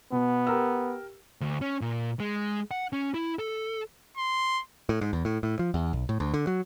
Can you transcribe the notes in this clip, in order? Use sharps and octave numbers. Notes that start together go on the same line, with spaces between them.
B2 B3
G4 A#4 E6
D2
C#4
A#2
G#3
F#5
C#4
E4
A4
C6
A2
G#2
E2
A2
A2
F3
E2
B1
A2
D2
D3
F#3